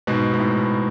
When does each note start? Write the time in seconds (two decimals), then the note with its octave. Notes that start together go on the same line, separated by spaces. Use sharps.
0.07 G#2 B2
0.34 G#2
0.40 A2